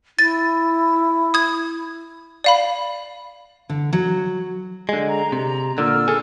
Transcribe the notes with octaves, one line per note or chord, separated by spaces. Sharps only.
E4 A6
D#6 G#6
D5 F5 B5
D3
F#3
D3 G#3
A#5
C3
A#2 D3 E6 F6
G#4 A4 G#5